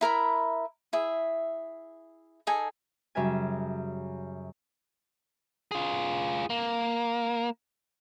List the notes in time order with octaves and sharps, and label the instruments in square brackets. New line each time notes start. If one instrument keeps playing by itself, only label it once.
[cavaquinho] E4 A#4 E5 B5
E4 G#4 E5
D#4 G#4 A4 G#5
[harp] F#2 C#3 G3 E5 G#5
[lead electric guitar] F4 G#4
A#3